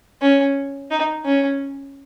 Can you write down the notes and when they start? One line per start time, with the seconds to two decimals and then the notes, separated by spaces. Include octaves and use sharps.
0.22 C#4
0.91 D#4
1.25 C#4